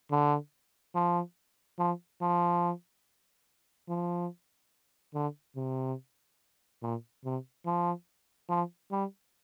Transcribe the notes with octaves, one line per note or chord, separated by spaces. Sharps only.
D3
F3
F3
F3
F3
D3
C3
A#2
C3
F3
F3
G3